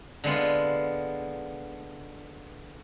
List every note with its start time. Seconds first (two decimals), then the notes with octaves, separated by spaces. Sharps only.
0.24 D3 G#3 B3 F4